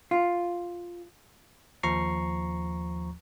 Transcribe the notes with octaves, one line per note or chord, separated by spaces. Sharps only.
F4
D#2 F3 A#5 C#6 C7